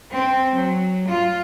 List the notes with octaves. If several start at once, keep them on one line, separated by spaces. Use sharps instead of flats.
C4
F#3
F4